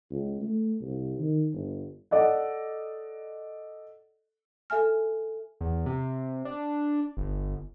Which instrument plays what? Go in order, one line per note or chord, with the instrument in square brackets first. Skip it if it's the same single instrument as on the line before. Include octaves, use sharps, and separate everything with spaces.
[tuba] C#2
A3
C2
D#3
G1
[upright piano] A4 D5 D#5 F#5
[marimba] A4 E5 G#5 F6
[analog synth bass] E2
C3
D4
G1